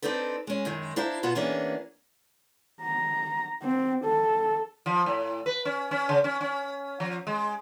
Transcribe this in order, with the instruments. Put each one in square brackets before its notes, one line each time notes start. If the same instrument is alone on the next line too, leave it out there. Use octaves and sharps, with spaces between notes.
[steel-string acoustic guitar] C4 D4 D#4 A4 B4
G#3 C#4
F#2 D#3 G#3
D4 E4 C5 F5 A#5
B2 B3 F4 F#4
E3 A#3 B3 C#4 D4 G#4
[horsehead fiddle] A#5
C4
A4
[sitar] F3
A2
B4
C#4
C#4
C#3
C#4
C#4
F3
G#3